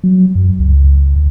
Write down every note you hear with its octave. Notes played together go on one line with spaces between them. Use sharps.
F#3
F#2
C#2
D2